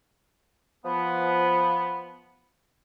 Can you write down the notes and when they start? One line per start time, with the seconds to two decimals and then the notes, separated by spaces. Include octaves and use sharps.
0.85 F3 B3